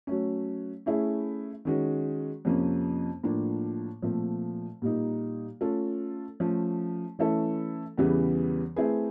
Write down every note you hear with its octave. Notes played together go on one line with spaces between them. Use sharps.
F#3 A3 C#4
A3 C#4 E4 G#4
D#3 G#3 C#4 F#4
F2 C3 F3 A#3 C#4
A2 F3 A#3 D4 F4
A#2 F3 A3 C4
A#2 G3 A#3 D#4
A3 C#4 F4 A4
F3 A3 C#4
E3 A3 C#4 E4 A4
E2 C#3 E3 G3 B3
A3 C4 E4 G#4 B4